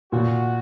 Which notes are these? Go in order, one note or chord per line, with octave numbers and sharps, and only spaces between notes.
A#2 F#4